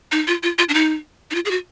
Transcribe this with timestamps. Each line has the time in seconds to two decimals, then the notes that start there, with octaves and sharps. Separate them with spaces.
0.12 D#4
0.27 F4
0.43 F4
0.58 F4
0.69 D4
0.74 D#4
1.31 D#4
1.35 F4
1.45 G#4
1.51 F#4